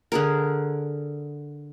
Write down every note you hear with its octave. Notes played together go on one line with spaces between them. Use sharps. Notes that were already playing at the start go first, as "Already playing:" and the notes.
D3 G#4 A#4